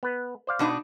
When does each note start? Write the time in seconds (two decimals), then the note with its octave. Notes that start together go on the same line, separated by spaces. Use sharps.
0.03 B3 B4
0.47 C5 D5 F5
0.59 B2 D4 D#4